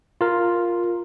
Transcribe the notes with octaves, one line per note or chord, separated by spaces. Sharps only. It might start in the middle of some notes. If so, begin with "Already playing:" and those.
F4 A#4